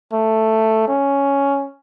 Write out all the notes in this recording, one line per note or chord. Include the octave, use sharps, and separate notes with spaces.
A3
C#4